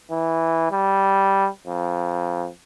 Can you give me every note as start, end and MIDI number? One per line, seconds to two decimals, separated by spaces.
0.11 0.67 52
0.71 1.48 55
1.67 2.48 41